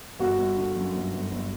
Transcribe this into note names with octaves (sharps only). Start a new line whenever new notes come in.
G1 F#4
G1
D3
F#2
G1
G1
G1